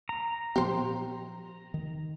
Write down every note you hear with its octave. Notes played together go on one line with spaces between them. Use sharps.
A#5
A#2 F3 B3 G4 C5
D#3